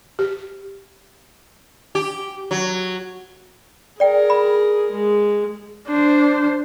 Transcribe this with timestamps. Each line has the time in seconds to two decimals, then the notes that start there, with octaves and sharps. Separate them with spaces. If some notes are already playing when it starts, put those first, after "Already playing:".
0.19 G4
1.95 G4
2.51 F#3
4.00 G#4 A#4 D5 G5
4.30 B5
4.92 G#3
5.87 D4 C5